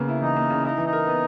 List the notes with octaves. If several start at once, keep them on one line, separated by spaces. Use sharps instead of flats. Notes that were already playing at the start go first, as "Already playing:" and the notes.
Already playing: C#3 A#3 B3
E4
E3 D#4
A#3
C#3
D#4 E4
E3
D#4
A#4
B3